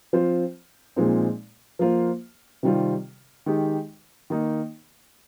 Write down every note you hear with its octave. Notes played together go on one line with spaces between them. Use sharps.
F3 C4 F4 C5
A#2 F3 G#3 C4 D#4
F3 A#3 F4 C5
C3 D#3 G3 C4 F4
D#3 G#3 D#4 G4
D#3 A#3 D#4